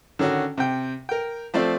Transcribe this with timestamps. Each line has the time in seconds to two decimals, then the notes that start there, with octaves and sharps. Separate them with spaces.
0.19 D3 D#3 C#4 F#4
0.58 C3 G5
1.09 A#4 G5
1.54 F3 A3 C4 D5